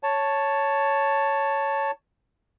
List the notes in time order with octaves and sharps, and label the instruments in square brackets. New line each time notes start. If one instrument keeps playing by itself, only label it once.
[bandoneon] C#5 A5